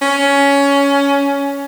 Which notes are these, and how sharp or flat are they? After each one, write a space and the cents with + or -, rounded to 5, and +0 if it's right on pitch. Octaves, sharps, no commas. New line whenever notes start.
C#4 +15